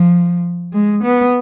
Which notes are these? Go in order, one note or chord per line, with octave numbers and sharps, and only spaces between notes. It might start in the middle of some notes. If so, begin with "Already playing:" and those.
Already playing: F3
G#3
B3